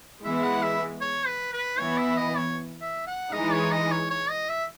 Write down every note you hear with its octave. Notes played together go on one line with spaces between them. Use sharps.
E3 G#3 B3 E4 E5
F#5
E5
C#5
B4
B4
E3 B3 E4 C#5
E5
D#5
C#5
E5
F#5
E3 G#3 D#4 D#5
C#5
D#5
C#5
C#5
D#5
E5